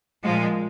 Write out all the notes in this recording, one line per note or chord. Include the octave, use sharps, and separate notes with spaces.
A#2 F3 G#3 F#4